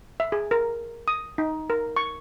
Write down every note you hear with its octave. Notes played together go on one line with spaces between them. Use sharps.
E5
G#4
A#4
D#6
D#4
A#4
C#6